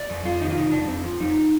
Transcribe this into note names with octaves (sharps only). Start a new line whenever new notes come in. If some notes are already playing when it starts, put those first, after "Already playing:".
Already playing: D5
F2
F2 F4
D#3 D#4
F4
C3 D#4
F2 D4
F2 C4
F3
F2 D#4